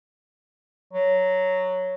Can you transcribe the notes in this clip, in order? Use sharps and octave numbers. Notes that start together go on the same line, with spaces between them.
F#3